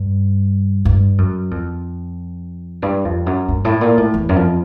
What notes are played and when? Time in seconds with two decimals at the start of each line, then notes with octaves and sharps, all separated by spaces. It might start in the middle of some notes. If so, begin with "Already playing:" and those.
Already playing: G2
0.85 G2
1.18 F#2
1.51 F2
2.82 G2
3.05 F2
3.26 F#2
3.48 G2
3.65 A2
3.81 A#2
3.98 A2
4.14 E2
4.29 F#2
4.36 F2